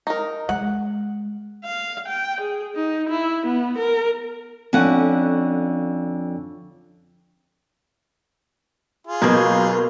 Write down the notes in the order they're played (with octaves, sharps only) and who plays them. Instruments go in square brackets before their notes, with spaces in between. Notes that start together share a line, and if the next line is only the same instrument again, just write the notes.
[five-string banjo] D#4 A#4
[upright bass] G#3 [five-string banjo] F#5
[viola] F5
G5
G#4
D#4
E4
B3
A#4
[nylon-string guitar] F2 D3 C#4 F#5
[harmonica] F4 G#4
[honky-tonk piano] B1 G6 G#6 [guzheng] B2 A#3